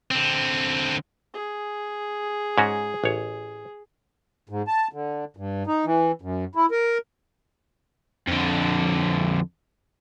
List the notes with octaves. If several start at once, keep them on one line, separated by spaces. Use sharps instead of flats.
D3 C4
G#4
G#2 C#4 F#4
A1 C#5
G#2
A5
D3
G2
D#4
E3
F#2
E4
A#4
F2 D3